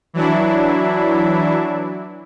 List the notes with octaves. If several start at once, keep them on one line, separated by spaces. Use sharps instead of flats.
E3 F#3 D4 E4